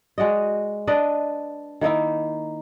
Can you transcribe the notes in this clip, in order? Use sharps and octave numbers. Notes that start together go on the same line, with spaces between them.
G#3 F#4 D5 D#5
D4 B4 D5 D#5
D#3 A#3 D#4 E4